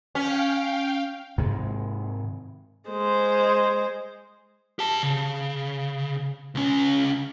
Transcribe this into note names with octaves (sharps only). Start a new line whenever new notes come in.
C#4 F5 G5
G#2 C3 D#3 G#3
G#3 C5
G4 A5
C#3
C#2 C#4